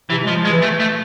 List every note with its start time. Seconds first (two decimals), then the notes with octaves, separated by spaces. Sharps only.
0.10 C3 E3
0.24 F3 G#3
0.36 F3
0.45 G#3
0.49 E3
0.62 A3
0.80 A3